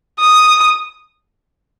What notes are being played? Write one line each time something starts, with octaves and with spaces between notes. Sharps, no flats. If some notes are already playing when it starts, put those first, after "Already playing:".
D#6